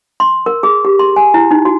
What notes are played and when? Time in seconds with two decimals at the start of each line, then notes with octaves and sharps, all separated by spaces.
0.20 C6
0.46 A#4
0.63 G#4
0.85 G4
0.99 C6
1.16 G#5
1.34 E4
1.51 D#4
1.65 F#4